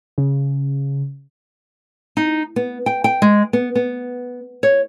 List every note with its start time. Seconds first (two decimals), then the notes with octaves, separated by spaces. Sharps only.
0.18 C#3
2.17 D#4
2.56 B3
2.86 G5
3.04 G5
3.22 G#3
3.53 B3
3.75 B3
4.63 C#5